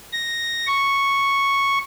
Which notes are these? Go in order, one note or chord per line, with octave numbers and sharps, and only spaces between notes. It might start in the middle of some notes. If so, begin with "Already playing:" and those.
A#6
C#6